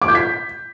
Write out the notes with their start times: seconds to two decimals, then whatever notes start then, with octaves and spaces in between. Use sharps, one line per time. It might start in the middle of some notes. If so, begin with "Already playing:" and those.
0.02 D6
0.08 G6
0.15 B6